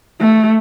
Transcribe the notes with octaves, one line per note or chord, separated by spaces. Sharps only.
A3